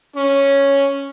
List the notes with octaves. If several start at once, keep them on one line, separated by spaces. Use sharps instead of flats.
C#4